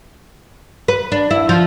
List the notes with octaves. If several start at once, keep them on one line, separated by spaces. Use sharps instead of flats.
B4
D4
E4
F3